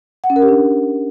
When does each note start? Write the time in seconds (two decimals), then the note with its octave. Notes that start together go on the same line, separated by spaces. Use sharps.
0.24 F#5
0.30 C#4
0.36 A#4
0.42 G4
0.48 D4